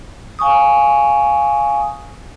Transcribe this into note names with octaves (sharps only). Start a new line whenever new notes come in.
F5 G#5 C#6 D#6